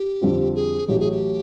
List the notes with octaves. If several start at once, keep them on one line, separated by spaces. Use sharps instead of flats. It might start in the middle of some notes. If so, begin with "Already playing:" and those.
Already playing: G4
F2 D3 G3 C4 F4
G#4
A1 A2 F#3 G4
G#4
G4